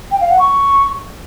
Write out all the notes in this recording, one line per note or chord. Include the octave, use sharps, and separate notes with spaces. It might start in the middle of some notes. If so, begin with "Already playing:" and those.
G5
F5
F#5
C#6